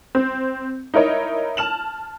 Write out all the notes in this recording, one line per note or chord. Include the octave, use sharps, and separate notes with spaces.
C4
D#4 E4 A#4 C#5 D#5
A5 F6 E7 F#7